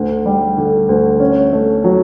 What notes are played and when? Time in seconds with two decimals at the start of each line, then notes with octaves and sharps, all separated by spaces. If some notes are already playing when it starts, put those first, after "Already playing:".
Already playing: D2
0.25 G3
0.58 D3
0.89 D2
1.20 C#4
1.53 A3
1.84 F#3